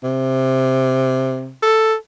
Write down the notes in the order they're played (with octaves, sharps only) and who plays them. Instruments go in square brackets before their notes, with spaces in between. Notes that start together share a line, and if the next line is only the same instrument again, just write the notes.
[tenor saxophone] C3
A4